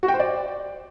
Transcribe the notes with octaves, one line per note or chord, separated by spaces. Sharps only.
F#4
G5
C5
D5